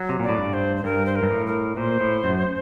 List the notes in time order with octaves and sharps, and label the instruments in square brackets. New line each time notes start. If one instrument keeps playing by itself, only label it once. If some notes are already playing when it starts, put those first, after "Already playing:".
Already playing: [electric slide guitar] F#3
C3
[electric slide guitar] A#2 [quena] D5
[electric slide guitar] A2
G2
[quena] C5
C5
[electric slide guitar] G2 [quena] A#4
[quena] C5
A#4
[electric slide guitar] G2
A2
[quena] A#4
[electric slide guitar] A#2 [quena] C5
[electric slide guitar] A2
F#2